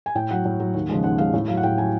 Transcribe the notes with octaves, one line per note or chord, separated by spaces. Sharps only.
G#5
A2 G5
F#3 F#5
A2
F#3
D#2
C#3 F3 G#3
D#2 F#5
C#3 F3 G#3 F5
A2
F#3 F5
F#5
A2 G5
F#3 G#5